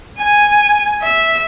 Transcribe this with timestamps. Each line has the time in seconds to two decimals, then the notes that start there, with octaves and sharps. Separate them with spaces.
0.18 G#5
1.02 E5